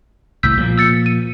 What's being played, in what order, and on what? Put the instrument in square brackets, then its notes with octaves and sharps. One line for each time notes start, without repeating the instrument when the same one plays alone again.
[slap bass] C2 A2 [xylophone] E6 G6 B6
[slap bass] A#2 F3 A#3
[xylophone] E6 A6 C#7
D#7